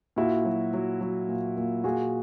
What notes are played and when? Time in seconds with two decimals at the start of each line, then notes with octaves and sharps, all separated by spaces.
0.16 A#2 E4 F#4
0.45 F#3
0.73 F#3
1.01 F#3
1.28 A#2
1.57 A#2
1.84 A#2 F#4 G#4